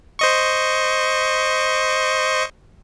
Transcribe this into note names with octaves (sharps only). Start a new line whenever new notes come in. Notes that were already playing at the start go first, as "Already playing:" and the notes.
C5 D#5 C#6